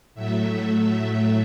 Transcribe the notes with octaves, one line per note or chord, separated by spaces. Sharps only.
A2 F#3 A3 E5